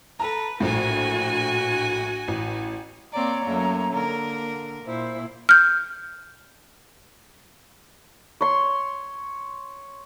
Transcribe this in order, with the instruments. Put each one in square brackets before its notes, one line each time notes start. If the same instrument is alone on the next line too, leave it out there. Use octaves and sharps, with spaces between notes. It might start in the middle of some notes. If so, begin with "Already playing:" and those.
[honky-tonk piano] A4 A5 A#5 [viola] B4
[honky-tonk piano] A#1 A2 [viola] F#4 G#5
[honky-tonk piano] A1
[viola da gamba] A#3 C4 D5 [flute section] C#5 A#5
[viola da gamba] F#2 A3 A#3
D3 A#3 A#4
[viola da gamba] A#2 E4 [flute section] C5
[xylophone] F6 G6
[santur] C#5 C6